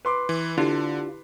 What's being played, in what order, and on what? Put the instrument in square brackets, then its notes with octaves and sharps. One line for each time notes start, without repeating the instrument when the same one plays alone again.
[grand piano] B4 C6 D6
[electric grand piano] E3
[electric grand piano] D3 [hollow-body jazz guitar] D4 F4 [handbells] E4 G4